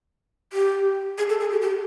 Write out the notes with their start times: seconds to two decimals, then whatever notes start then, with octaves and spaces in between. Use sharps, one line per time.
0.53 G4
1.18 G#4
1.29 A4
1.40 G#4
1.51 G4
1.62 G4